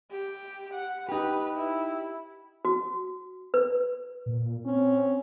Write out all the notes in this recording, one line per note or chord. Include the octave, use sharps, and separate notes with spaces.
G4
F#5
D#4 G4 B4
E4
F#4
B4
A#2
C4 C#4